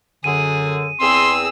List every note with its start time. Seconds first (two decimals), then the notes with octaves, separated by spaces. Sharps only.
0.24 F#2 D3 G#4 D#7
1.00 E2 C4 G#4 C6 E6